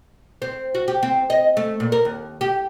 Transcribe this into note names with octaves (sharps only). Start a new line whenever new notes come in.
C4
F#4
G4
C4
D#5
A3
A#2
A#4
D#2
G4